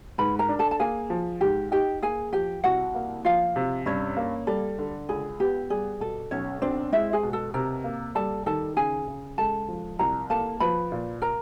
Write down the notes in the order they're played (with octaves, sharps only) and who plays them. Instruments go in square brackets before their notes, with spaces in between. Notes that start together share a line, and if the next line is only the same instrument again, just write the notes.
[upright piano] G#2 [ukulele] B4 B5
[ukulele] A#4 A#5
[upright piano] D4
[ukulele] A4 A5
A5
[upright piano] A#3 [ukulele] G#4 G#5
[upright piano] F3
[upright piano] G#2 [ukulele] G4 G5
[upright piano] D#4 [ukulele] G4 G5
[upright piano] A#3 [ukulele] G#4 G#5
[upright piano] F3 [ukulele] G4 G5
[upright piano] C2 [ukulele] F#4 F#5
[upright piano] A#3
[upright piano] F3 [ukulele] F4 F5
[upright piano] C3
[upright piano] G2 [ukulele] C#4 C#5
[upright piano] A#3
[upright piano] G3 [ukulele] A4
[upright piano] D3
[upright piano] C#2 [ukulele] G#4
[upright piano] B3 [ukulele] G4
[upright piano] G3 [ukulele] G#4
[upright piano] B2 [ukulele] A4
[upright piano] B1 [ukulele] C#4 C#5
[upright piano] C4 [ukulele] D4 D5
[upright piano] G#3 [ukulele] E4 E5
[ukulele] G#4 G#5
[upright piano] B2
[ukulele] A4 A5
[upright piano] C3 [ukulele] A#4 A#5
[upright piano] A#3
[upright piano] G3 [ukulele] A4 A5
[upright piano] D#3 [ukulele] A4 A5
[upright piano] C#3 [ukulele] G#4 G#5
[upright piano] C#3
[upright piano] G#3 [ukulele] A4 A5
[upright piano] F3
[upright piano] C2 [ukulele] A#4 A#5
[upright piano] A#3 [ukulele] A4 A5
[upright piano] F3 [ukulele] B4 B5
[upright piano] A#2
[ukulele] A#4 A#5